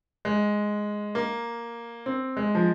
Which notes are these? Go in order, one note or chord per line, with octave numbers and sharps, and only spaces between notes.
G#3
A#3
C4
G#3
F3